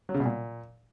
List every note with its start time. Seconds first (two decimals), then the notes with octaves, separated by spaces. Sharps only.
0.09 F#3
0.14 C#3
0.20 B2
0.26 A#2